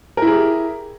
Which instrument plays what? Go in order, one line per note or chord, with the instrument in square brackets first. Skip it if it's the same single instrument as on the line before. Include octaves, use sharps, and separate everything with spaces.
[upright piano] A#4
E4
G#4
G4